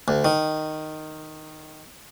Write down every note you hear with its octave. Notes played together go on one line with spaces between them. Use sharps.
D2
D#3